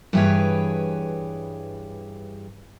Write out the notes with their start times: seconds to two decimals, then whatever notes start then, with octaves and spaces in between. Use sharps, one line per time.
0.13 G2 E3 G4 G#4 B4 C#5